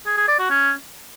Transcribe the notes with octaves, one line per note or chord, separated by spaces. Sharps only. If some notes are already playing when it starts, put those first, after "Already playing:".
G#4
G#4
D5
F#4
C#4